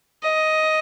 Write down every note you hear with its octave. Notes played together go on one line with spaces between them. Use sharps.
D#5